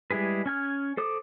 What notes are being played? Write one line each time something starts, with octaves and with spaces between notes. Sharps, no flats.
G3 G#3 E4 G#4 B4
C#4 G#5 F6
A4 C5 D6 D#6